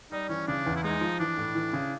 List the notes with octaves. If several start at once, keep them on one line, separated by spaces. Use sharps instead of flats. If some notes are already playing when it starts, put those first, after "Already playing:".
G3 D#4
E3 C#4
C#3 D4
E2
E4
G#3 D#4
F3
E3 D4
A2
E3
C#3